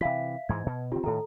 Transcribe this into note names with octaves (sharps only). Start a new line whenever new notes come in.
C3 E3 E5 F5 B6
G#2 E3 G#3 G#6
B2
D3 C4 F4 G4
A2 D#3 A4 A#5